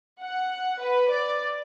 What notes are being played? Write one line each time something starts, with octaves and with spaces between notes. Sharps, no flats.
F#5
B4
D5